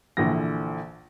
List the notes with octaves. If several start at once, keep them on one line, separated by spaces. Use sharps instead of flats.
A#1 D3 E3 A#6